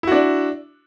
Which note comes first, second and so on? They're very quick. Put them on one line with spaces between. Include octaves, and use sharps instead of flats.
E4 F#4 D4